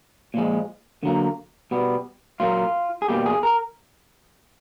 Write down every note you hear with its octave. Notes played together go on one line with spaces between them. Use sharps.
A#2 F3 G#3
D3 F#3 A#3
B2 G3 B3
A#2 F#3 A#3 F4
G#4
B2 G3 A#3 G4
G#4
A#4